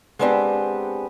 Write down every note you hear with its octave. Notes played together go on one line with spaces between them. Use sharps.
G#3 B3 C4 D4 G4